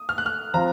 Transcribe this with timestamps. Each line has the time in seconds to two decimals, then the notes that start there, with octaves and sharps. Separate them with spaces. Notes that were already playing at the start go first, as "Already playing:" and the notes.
Already playing: D#6
0.09 F6
0.18 F#6
0.26 F6
0.54 F3 C4 F4 A#5